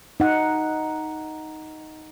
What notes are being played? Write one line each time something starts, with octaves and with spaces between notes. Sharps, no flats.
D#4 F#5